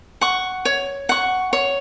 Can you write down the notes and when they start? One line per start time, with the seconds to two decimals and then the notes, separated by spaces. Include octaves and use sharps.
0.21 F#5 C#6
0.65 C#5
1.09 F#5 C#6
1.53 C#5